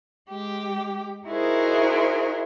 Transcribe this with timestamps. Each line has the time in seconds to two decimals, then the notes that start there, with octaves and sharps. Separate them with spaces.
0.30 G#3 G4
1.28 D#4 E4 F#4 G#4 A#4 C5